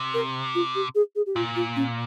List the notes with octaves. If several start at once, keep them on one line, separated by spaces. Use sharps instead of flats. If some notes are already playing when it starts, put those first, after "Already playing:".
Already playing: C3
A#4
F4
G4
G#4
G#4
G4
A#2 F4
F4
C#4